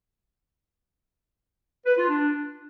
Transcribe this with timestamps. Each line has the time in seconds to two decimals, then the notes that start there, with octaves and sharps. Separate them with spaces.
1.86 B4
1.97 F4
2.09 D4